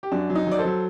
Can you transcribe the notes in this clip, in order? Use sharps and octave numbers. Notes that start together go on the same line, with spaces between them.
G4
F#2 D4 F#4
F#3
D#4
F#3 D5
A4 C5
F#3